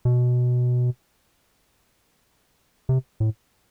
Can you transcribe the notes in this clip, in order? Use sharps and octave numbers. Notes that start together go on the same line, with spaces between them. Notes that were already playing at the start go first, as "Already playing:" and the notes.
B2
C3
A2